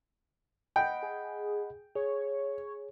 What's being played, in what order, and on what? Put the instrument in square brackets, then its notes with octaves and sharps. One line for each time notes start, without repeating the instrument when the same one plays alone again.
[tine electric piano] D#5 F#5 B5 [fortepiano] G5
[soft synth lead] G#4
[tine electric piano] G#4 [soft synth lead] C#5